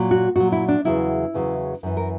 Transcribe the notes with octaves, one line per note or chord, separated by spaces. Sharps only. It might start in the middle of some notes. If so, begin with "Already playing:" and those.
Already playing: A#2 F#3
F#4
A#2 F#3 F#4
E4
D4
E2 C#3 F#3 E4
E2 C#3 F#3
F#2 E3
A#4